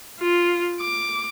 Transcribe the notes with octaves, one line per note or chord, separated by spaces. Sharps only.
F4
D6